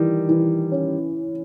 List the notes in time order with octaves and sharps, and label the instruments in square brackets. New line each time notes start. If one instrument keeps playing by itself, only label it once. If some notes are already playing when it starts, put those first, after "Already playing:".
Already playing: [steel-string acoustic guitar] D#3 G3 [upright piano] E3
[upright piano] E3
C#4